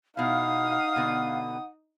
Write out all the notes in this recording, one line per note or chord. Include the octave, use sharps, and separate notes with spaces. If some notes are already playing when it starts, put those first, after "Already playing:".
B2 D#4 E4 F5 F#5 D#6
B2 D3 B3